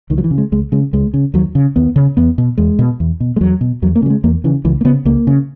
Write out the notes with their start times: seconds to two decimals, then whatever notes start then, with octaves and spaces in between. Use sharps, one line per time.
0.10 C#2 D#3
0.18 F#3
0.24 E3
0.31 C#3
0.38 G#3
0.52 C#2 G#3
0.72 C#3 G#3
0.93 C#2 G#3
1.14 C#3
1.34 D#2 F#3
1.55 C#3
1.76 D#2 B3
1.96 C#3
2.17 E2 B3
2.38 B2
2.58 E2 G#3
2.79 B2
3.00 E2
3.20 B2
3.36 G#3
3.41 E2 F#3
3.61 B2
3.82 E2 F#3
3.96 A#3
4.02 C#3 F#3
4.10 G#3
4.24 E2 A#3
4.44 C#3 E3
4.65 C#2 E3
4.81 A#3
4.85 C#3 B3
5.05 C#2 A#3
5.27 C#3